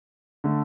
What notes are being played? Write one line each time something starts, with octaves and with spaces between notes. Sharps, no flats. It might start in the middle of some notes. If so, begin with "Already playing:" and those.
D3 A3